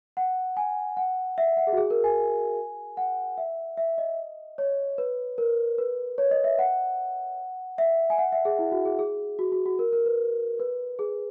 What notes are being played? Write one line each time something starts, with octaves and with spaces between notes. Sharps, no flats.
F#5
G#5
F#5
E5
F#5
G#4
F#4
G#4
A#4
G#5
F#5
E5
E5
D#5
C#5
B4
A#4
B4
C#5
D#5
E5
F#5
E5
G#5
F#5
E5
G#4
E4
F#4
G#4
G#4
F#4
F#4
F#4
A#4
A#4
B4
B4
G#4